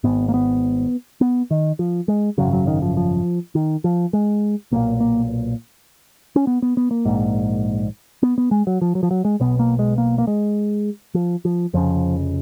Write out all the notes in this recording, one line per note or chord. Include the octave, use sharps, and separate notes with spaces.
G#1 G#2 B3
A#3
B3
B3
D#3
F3
G#3
G#1 F#2 C#3 F#3
F#3
D#3
F3
F3
D#3
F3
G#3
B1 A#2 A#3
A#3
C#4
B3
B3
B3
A#3
A#1 G#2
B3
B3
G#3
F#3
F3
F#3
F3
F#3
G#3
B1 B2 B3
A#3
G#3
A#3
A#3
G#3
F3
F3
F1 F2 C#3 F3